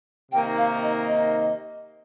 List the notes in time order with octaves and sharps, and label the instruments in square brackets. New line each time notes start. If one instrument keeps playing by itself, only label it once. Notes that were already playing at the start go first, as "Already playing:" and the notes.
[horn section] C3 D#3 A#3 D#4 [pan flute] G5
[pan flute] F5
D#5
D#5